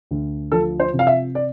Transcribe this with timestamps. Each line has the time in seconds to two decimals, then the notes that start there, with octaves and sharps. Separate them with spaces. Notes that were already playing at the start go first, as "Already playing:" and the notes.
0.11 D2
0.52 F3 A4
0.80 C5
0.93 C3
0.99 F5
1.07 E5
1.35 D5